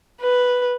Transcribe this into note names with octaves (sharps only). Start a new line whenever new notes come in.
B4